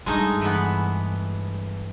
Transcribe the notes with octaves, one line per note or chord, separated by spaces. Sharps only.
G2 G#3 A3 D#4
E3 B3